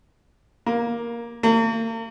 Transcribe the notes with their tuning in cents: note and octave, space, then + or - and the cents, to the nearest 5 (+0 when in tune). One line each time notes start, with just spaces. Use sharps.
A#3 +10
A#3 -45